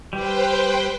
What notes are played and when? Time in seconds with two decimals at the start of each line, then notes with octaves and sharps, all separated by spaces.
0.13 G3 B4 C5 G5